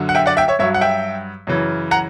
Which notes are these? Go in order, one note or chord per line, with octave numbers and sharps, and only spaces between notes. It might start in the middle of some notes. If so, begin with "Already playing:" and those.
Already playing: F#2 D3 F#3
F#5
E5 G5
D5 F#5
E5 G5
C#5 E5
G2 F#3 C#5 E5
F#5
E5 G5
F#2 C#3 E3
F#5 A#5